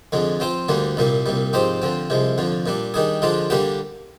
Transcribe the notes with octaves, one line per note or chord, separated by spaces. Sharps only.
F2 D3 G#3
F3 C4 F4 C5
D2 D3 G3 A#3
C2 A#2 G3 A#3
C2 A#2 G3
G#2 F3 C4 G4 C5
D3 F3 C4
C2 C3 F3 G#3
F2 D3 F3
A#2 G3 D4
D#3 G3 D4 G#4
D3 F3 G#3 D4 F4
D3 G3 A#3 D4 G4